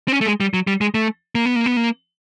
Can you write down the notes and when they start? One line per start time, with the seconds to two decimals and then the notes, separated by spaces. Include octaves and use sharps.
0.08 C4
0.13 C#4
0.21 A3
0.27 G#3
0.40 G3
0.54 F#3
0.67 G3
0.81 G#3
0.94 A3
1.35 A#3
1.46 B3
1.56 A#3
1.66 B3
1.77 A#3